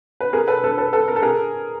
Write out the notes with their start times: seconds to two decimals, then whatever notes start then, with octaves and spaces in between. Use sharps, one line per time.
0.21 B4
0.33 G#4 A#4
0.48 A4 B4
0.64 A4 B4
0.78 A4 B4
0.93 A4 B4
1.08 A#4
1.16 A4
1.22 G#4 A#4